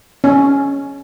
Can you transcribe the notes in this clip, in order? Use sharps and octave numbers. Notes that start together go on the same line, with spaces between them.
C#4